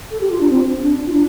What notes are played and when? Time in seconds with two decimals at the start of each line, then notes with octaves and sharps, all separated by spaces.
0.11 A4
0.21 G4
0.31 F4
0.40 D4
0.50 C4
0.82 D4
1.07 F4
1.13 D4